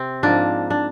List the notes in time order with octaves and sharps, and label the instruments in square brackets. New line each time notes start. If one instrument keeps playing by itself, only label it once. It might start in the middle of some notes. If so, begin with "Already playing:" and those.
Already playing: [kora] C3 C4
G#2 F3 A#3 D4
D4